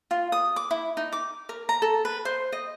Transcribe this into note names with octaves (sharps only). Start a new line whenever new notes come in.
F4
D#6
D6
E4
D#4
D6
A#4
A#5
A4
B4
C5
D#5